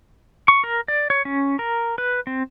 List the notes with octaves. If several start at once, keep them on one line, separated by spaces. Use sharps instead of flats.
C#6
A#4
D5
C#5
C#4
A#4
B4
C4